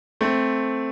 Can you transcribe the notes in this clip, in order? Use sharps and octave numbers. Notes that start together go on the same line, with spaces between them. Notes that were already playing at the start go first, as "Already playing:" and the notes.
A3 C4